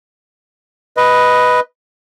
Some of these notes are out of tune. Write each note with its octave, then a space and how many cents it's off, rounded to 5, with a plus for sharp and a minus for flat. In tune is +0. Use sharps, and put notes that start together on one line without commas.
B4 +0 D#5 +5